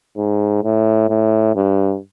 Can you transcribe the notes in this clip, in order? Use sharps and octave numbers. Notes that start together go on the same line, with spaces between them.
G#2
A2
A2
G2